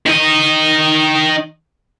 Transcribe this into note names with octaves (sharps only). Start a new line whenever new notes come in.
D#3 D#5